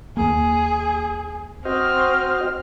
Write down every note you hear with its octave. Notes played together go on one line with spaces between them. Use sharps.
D#2 A#3 G#4
C4 F#4 C5 D#5 F6